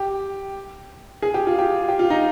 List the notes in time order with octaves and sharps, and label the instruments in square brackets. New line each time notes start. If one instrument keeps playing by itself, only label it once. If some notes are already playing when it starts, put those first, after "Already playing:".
Already playing: [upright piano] G4
G#4
G4
F4
G4
G4
F4
D#4